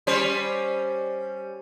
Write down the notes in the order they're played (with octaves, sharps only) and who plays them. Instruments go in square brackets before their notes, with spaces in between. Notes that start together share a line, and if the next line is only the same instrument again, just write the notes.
[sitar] G3 C#4 C5